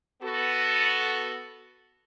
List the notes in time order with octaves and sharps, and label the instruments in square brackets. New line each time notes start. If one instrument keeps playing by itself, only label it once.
[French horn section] B3 F#4 A4